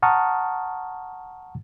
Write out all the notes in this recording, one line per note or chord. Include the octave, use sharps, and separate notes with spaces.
F#5 A5 A#5 C#6 D#6 F6